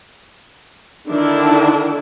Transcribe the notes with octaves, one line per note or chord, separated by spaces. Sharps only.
D3 D#3 D4 E4